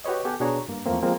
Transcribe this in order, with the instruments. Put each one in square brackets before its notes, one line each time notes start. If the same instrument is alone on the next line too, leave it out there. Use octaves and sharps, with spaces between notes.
[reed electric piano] F#4 G4 B4 C#5 D#5
B3 G4 A4 F#5 G#5
B2 D4 F#4 G#4 C#5 A#5
G2 A#3
E2 F3 A3 A#3 C4
F3 G#3 A#3 C4